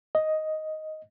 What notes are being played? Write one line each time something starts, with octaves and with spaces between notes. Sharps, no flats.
D#5